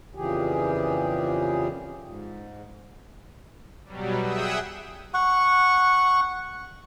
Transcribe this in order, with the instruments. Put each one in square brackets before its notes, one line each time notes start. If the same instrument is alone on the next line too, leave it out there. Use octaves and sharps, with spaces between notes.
[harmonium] F2 A#2 C#3 E3 G4 G#4
G#2
[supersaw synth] B2 F#3 G3
G#4 E5 F#5 G5 D#6 E6
[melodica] F#5 C#6